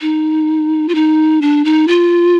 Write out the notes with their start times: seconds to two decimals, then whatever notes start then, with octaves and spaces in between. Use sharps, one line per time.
0.01 D#4
0.89 F4
0.95 D#4
1.42 D4
1.65 D#4
1.88 F4